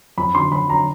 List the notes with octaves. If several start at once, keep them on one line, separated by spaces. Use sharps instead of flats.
F2 B5
D3 F#3 C6
F2 B5
D3 F#3 A#5